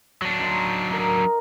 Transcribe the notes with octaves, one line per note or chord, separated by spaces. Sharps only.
F#3 D4
D#4 C6 C#6
D#4 A#4